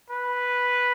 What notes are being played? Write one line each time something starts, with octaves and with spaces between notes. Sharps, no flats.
B4